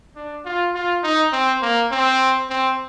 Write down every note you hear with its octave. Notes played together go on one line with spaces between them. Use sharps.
D4
F4
F4
D#4
C4
A#3
C4
C4